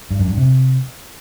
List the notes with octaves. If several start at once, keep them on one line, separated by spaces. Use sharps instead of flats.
G2
F#2
G2
C3